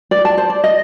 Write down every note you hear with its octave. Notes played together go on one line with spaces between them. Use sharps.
D5
A5
C5
D5
D#5